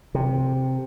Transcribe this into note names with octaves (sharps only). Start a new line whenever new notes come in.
C3